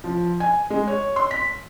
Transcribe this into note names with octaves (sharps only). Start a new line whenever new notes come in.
F3
G#5
G#3
C#5
C6
B6